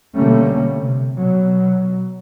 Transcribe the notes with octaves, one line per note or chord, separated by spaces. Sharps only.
B2 D3 G3 A3 A#3 C#4
C3
B2 F#3